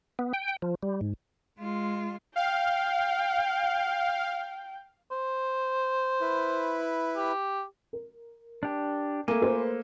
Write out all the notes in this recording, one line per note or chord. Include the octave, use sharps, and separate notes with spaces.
B3
G5
F3
G3
G#2
G#3 F4
F5 G5
C5
E4 B4
G4
A#4
D4 G4
A3 A#3 G#5 D6
F4 B4 C5